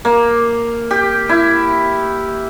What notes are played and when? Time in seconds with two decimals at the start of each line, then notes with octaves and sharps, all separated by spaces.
0.05 A#3
0.91 G4
1.29 E4